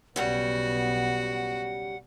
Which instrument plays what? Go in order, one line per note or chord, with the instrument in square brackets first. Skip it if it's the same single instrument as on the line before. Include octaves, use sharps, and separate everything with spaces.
[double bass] B1 B3 [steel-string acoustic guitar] C#3 G3 [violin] F#4 [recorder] F#5